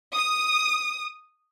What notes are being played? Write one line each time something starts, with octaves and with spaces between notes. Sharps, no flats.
D#6